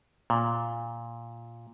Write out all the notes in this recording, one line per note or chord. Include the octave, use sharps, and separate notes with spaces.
A#2